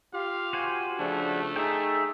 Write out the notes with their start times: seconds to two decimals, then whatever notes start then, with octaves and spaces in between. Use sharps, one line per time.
0.14 F4 G4 F5
0.53 F#4 C5 G#5
0.99 C#3 F3 A3 D4
1.56 D#4 G#4 E5 G5